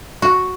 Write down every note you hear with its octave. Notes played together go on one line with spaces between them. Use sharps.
F#4